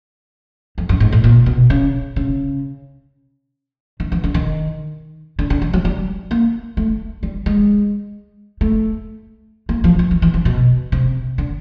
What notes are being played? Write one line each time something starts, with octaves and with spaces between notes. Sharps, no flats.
F2
F#2
G#2
A2
A#2
B2
C#3
C#3
D#3
E3
D3
D#3
D3
D3
D#3
F#3
G3
A#3
A3
G3
G#3
A3
A#3
F3
E3
E3
E3
F3
B2
C3
D3